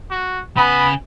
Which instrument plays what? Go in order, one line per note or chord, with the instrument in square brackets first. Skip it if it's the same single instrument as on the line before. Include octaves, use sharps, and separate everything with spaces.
[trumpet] F#4
[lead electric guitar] C#3 G#5 [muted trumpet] B3 [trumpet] B5